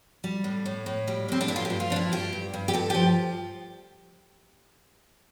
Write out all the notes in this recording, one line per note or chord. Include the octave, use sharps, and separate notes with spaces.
G3
A2
A2
A2
G3
A2 C4
D4
G2 E4
F4
G4
G2
F4
F3 D4
E4
G2 G4
G2
G2
G4
G2 A4
F3 G4